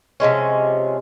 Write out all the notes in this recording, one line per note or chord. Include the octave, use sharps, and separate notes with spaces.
C3 F3 G#3 C#4